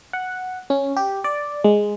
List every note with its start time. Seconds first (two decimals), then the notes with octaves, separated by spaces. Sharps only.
0.13 F#5
0.70 C#4
0.96 G4
1.24 D5
1.64 G#3